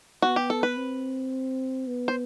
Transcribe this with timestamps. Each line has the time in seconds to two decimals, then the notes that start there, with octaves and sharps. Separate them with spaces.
0.22 B3 F#4
0.36 G4
0.50 A4
0.63 B4
0.77 C4
1.87 B3
2.08 C5